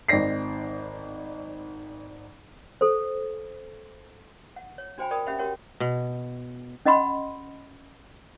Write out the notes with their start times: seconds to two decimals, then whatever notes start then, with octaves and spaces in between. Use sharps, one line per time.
0.08 G#1 C4 D#4 D5 A#6 C7
2.81 A4 C5
4.56 F#5
4.78 C#5
4.98 D4 F#4 C5 G5 G#5 B5
5.11 A#4 D5 G5 B5 D#6
5.27 C#4 G4 E5 F#5 B5
5.38 F#4 G4 A#4 C#5 F#5 G5
5.80 B2
6.86 C#4 D#5 F#5 B5 C6